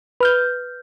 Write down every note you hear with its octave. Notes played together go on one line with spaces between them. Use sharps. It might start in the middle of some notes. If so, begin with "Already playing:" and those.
B4 F6 G6